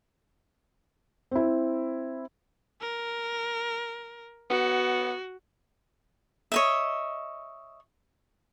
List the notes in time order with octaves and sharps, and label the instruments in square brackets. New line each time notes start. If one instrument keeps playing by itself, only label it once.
[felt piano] C4 E4
[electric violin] A#4
[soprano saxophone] B3 [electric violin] F#4
[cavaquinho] C#5 D#5 E5